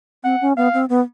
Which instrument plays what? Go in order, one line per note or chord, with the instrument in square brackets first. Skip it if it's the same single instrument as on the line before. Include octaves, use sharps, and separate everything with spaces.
[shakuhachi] C4 [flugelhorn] F#5
[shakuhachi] C#4
[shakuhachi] B3 [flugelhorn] F5
[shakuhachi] C4
B3